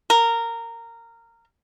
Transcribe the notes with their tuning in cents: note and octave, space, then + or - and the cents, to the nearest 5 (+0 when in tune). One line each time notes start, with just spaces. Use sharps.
A#4 -15